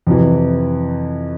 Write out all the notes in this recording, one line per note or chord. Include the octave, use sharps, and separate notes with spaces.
F2 C3 E3